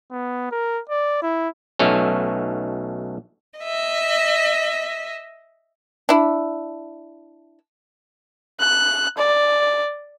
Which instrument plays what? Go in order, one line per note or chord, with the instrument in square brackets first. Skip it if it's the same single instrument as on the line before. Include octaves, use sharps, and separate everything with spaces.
[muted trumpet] B3
A#4
D5
E4
[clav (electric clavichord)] B1 B2 A3 C#4
[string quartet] D#5 E5
[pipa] D4 E4
[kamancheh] F#6
D5